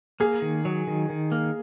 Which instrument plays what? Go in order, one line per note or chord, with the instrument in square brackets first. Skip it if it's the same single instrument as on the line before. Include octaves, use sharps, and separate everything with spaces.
[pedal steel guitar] A#3 [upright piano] G#4
[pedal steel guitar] D#3
F#3
D#3
D#3
A#3